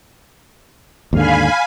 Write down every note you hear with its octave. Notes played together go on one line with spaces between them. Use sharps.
D#2 G#2 D3 F5 G#5 B5